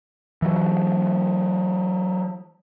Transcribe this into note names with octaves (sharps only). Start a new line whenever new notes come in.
E3 F#3